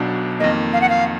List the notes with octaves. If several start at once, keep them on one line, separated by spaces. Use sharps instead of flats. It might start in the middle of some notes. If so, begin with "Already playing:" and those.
Already playing: B1 B2 F#3 D4
F2 D#3 A#3 D#5
F5
F#5
F5